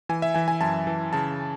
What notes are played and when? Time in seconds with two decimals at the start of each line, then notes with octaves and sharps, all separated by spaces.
0.09 E3 G#5
0.22 E5
0.34 E3 G#5
0.48 G#5
0.61 F#2 A5
0.87 E3
1.13 C#3 A5